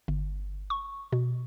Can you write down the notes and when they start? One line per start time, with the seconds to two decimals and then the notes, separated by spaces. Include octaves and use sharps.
0.08 G1
0.70 C#6
1.12 B2